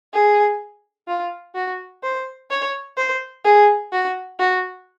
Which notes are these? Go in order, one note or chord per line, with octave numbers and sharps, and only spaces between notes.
G#4
F4
F#4
C5
C#5
C5
G#4
F#4
F#4